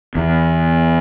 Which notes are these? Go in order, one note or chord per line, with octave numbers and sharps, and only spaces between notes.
E2